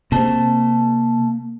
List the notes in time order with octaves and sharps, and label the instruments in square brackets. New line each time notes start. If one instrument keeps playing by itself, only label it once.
[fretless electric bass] C3 C4 [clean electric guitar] A#3 A5